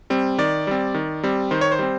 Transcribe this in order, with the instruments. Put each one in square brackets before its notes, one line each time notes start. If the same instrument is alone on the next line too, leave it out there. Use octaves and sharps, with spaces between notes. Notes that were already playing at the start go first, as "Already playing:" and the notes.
[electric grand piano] G3 C4
D#3 D5
G3 C4
D#3
G3 C4
D#3 C5
C#5
C5
G3 C4